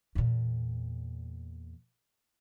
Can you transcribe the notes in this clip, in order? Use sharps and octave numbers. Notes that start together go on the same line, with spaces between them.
E2 A#2